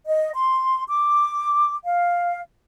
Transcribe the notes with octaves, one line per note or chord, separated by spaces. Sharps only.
D#5
C6
D6
F5